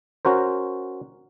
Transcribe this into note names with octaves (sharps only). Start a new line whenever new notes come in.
C#4 F#4 A#4 C5